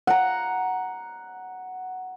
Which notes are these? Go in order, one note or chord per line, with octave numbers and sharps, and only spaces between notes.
F#5 A#5